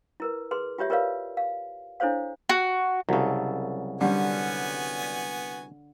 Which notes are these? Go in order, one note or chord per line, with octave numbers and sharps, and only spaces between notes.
E4 A#4 B4
G#4 B4 C6
F4 G4 C#5 E5
F4 A#4 B4 C#5 D5 F5
F5
D4 E4 A4 C5 C#5 F5
F#4
C2 C#3 F#3 A4
D3 G3 B3 C#4 F#4 G#5